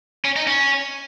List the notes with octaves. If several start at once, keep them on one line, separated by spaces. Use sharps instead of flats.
C#4
D#4
C#4